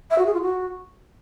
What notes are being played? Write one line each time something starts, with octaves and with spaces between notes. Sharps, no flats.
E5
F#4
G#4
F4
F#4